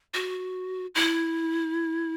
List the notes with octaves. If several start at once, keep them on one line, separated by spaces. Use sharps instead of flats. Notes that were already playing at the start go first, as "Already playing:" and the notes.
F#4
E4